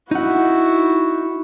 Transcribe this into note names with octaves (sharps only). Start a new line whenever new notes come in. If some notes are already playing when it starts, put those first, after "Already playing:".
D#4 E4 F#4 F#5